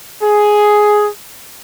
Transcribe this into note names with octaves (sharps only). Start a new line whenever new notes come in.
G#4